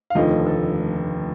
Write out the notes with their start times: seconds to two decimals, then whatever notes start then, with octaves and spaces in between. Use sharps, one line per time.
0.10 F5
0.15 F1 D#2 D3 F3 A3 D#5
0.46 A4